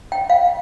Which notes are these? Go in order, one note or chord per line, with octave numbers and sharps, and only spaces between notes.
G5
F5